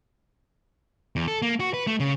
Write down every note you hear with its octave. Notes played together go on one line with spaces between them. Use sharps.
E2
A4
A#3
F#4
B4
A3
C#3